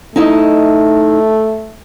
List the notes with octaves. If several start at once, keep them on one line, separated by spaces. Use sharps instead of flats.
A3 D#4 E4 D#5